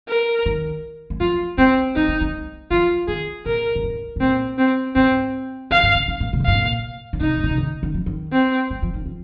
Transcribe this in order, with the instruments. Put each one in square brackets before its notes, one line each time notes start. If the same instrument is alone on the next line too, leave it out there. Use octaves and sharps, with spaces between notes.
[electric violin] A#4
[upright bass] D#3
G#3
[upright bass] F3 [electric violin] F4
[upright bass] G#3 [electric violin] C4
[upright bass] G#3 [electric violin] D#4
[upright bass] A#3
G#3
[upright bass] F3 [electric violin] F4
[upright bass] D#3 [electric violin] G#4
[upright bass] A#2 [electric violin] A#4
[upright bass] A#2
G#2
G#2
[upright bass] A#2 [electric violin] C4
[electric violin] C4
[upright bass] G#2 [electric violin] C4
[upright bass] F2 [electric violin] F5
[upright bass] G#2
C3
D#3
A#2
C3
A#2
[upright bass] G#2 [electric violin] F5
[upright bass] A#2
D#3
[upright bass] C3 [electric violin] D#4
[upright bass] G#2
A#2
C3
D#3
D#3
F3
D#3
[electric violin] C4
[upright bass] G#3
F3
D#3
F3